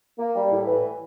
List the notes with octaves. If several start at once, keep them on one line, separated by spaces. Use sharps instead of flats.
A#3
G3
A2
E3